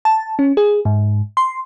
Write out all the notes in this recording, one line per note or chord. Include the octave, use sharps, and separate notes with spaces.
A5
C#4
G#4
G#2
C6